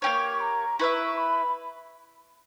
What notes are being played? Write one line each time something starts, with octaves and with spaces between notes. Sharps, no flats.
A#3 C#4 G4 C#5 C#6
A#5
E4 B4 E5 C#6
B5